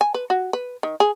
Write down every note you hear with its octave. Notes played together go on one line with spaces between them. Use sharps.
G#5
B4
F#4
B4
D#3
G#4